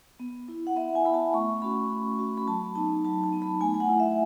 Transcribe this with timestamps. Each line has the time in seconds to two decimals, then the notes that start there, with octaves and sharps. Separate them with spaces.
0.20 B3
0.48 E4
0.67 F#5
0.76 B3 E5
0.95 G#5
1.05 E4 B5
1.14 A5
1.33 A3 C#6
1.62 C#4 F#4 B5
1.91 A3
2.19 C#4 F#4
2.37 B5
2.47 F#3 A5
2.75 B3 D#4 A5
3.04 F#3 A5
3.24 A5
3.33 B3 D#4
3.42 B5
3.61 A3 G#5
3.74 G#5
3.80 F#5
3.89 E4
4.00 E5